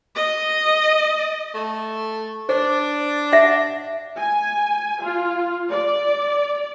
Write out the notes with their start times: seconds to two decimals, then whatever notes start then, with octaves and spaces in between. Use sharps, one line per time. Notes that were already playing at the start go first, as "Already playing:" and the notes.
0.15 D#5
1.54 A3
2.49 D4 C5
3.33 E5 F#5
4.17 G#5
5.02 F4
5.71 D5